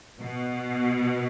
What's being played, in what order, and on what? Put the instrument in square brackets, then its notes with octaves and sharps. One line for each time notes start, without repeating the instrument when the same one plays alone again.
[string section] B2